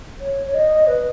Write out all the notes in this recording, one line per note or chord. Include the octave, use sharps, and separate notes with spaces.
C#5
C#5
D#5
B4